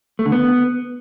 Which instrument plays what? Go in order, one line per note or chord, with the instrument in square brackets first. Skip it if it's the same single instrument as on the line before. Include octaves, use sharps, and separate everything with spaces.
[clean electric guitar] A3
D3
B3